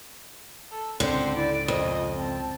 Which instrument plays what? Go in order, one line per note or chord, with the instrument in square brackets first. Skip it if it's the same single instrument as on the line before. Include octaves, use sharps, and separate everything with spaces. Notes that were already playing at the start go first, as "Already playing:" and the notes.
[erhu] A4
[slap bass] C#2 G#2 [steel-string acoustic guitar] D3 [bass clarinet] C4 [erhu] C5
[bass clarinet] E4 [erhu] D5
[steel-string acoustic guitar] F2 [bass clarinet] A#2 [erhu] D#5
[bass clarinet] C4 [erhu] A5